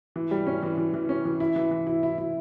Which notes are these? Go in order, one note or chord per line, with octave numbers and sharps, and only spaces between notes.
E3
G3
C#4
E3
E3
E3
C#4
E3
E4
E3
E3
E4
E4
E4